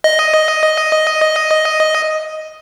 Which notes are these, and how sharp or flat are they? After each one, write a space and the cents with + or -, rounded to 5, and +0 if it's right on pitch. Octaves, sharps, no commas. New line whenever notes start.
D#5 +5